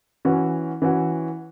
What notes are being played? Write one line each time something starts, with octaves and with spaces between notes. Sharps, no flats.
E3 C#4 F#4
E3 C#4 F#4